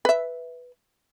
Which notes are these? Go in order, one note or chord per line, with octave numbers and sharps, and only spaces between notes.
B4 E5